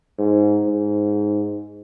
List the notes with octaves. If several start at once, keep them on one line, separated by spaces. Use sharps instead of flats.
G#2
G#2